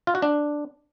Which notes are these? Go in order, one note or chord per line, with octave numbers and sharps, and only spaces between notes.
F4
F#4
D4